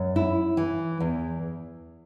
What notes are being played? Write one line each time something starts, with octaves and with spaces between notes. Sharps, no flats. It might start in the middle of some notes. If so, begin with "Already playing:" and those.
Already playing: F#2
E4
E3
E2